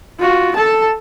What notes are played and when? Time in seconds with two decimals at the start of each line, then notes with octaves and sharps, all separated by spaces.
0.19 F4 F#4
0.56 A4 A5